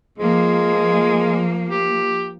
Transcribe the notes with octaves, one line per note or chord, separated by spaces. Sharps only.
F3 G#3 A#3
G4